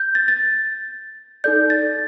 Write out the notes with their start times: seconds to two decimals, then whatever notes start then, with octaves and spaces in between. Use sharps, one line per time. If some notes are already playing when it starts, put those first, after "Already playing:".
Already playing: G6
0.15 A6
0.28 A6
1.44 D#4 A4 D5 G6
1.70 A6